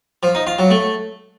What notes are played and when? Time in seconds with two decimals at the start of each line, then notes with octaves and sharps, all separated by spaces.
0.23 F3
0.35 D#4
0.47 F4
0.59 F#3
0.71 A3